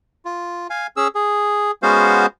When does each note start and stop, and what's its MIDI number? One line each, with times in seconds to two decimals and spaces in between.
0.25 0.67 65
0.70 0.87 77
0.70 0.87 80
0.97 1.08 61
0.97 1.08 68
0.97 1.08 88
1.15 1.71 68
1.83 2.26 56
1.83 2.26 59
1.83 2.26 61
1.83 2.26 66
1.83 2.26 72
1.83 2.26 77